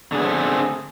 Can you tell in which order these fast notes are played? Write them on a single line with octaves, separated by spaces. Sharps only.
D3 G#4 B3 A3 C4